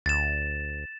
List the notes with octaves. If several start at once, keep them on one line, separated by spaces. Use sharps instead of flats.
D2 A6 E7